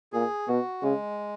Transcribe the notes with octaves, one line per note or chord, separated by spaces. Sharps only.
A#2 G#4
B2 F#4
C#3 G#3